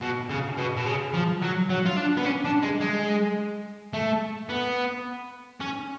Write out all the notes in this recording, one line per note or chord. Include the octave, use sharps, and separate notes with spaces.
B2
C#3
B2
B2
C#3
F3
F#3
F#3
F4
D4
B3
C#4
D4
G#3
G#3
A3
B3
C#4